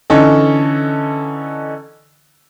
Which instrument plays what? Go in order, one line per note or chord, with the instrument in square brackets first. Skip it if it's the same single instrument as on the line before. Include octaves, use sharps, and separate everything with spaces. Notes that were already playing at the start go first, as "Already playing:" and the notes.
[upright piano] D3 E3 C#4 D#4 A4